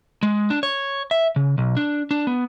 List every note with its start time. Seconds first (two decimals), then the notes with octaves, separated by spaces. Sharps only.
0.23 G#3
0.50 D4
0.63 C#5
1.11 E5
1.36 C#3
1.58 B1
1.77 D4
2.11 D4
2.27 B3